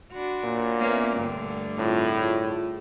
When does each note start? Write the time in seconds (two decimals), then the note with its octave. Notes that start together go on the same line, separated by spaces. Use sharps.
0.12 D4 F#4 B5 C6
0.44 A#2 A#3 C#5
0.79 A#3 B3 C#4 B4 E5
1.17 G2 D3 A3 G5
1.78 A2 C4 F4 G#4
2.19 F4 G#4